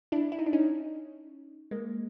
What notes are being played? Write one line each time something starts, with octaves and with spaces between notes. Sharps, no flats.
D4 E4
E4
D#4
D4
C#4 D#4
G#3 A#3